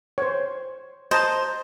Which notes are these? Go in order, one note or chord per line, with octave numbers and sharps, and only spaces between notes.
C5 C#5
C5 D#5 A5 A#5